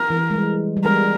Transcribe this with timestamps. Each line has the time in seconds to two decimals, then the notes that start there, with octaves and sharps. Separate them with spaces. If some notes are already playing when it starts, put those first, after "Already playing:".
Already playing: A#4
0.10 E3
0.31 G#3
0.35 G3
0.77 G3
0.84 G#3 A#4